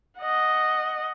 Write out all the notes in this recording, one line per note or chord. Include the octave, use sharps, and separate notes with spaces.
D#5 F#5